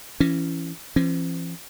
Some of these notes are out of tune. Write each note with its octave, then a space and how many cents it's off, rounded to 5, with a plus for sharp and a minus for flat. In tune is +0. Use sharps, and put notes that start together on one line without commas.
E3 +25 C#4 +0
F3 -45 C#4 -45